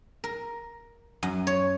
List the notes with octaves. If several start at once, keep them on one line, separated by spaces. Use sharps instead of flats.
A#4
F#2
C#5